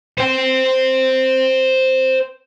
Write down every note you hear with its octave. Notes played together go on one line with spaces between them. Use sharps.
C5 G5